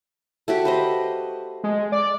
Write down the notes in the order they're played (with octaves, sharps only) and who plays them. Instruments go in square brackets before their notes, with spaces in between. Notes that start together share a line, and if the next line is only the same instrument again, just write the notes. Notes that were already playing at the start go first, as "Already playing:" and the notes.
[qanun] A3 F#4 G4
B4 C5 D#5
[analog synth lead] G#3
D5